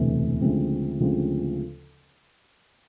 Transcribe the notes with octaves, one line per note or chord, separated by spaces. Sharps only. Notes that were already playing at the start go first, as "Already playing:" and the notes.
Already playing: E1 D2 C3 E3 A3
D2 C#3 F3 G#3 C4
D2 C#3 F3 G#3 C4